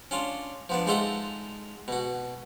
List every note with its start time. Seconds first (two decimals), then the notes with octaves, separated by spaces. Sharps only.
0.11 C#4 D4 F4
0.69 F3 B3 D4
0.87 G#3 D#4 F4 A4 E5 F#5
1.88 B2 F#4